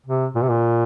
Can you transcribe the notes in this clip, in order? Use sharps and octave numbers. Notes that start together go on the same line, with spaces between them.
C3
A#2
C3
A#2